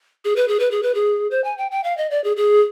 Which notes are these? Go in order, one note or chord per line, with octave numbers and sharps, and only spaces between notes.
G#4
B4
G#4
B4
G#4
B4
G#4
C5
G#5
G5
G5
F5
D#5
D5
G#4
G#4